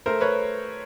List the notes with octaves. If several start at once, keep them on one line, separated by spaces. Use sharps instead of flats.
A3 A#4 C5
B4 C#5